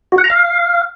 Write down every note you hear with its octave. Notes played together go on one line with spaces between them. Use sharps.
F#4
F#5
A#5
F5